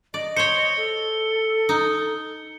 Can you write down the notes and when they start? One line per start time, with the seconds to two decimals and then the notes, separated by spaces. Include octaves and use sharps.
0.14 D5 D#5
0.36 C5 C#5 C#7 G7
0.77 A4
1.69 D#4